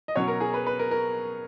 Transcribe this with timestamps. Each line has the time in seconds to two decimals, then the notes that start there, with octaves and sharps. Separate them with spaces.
0.08 D#5
0.16 B2 F#3 C#4 C#5
0.28 A#4
0.40 G#4
0.54 B4
0.67 B4
0.79 A#4
0.91 A#4